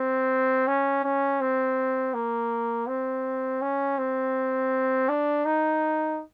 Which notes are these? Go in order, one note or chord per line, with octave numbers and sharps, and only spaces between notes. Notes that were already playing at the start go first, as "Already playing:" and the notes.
Already playing: C4
C#4
C#4
C4
A#3
C4
C#4
C4
D4
D#4